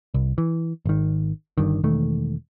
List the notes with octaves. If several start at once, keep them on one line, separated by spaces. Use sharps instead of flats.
C2
E3
G#1 D#3
G1 G2 D#3
E1 D#3 A3